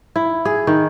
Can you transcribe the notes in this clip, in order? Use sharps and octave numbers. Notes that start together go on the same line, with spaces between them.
E4
G#4
D#3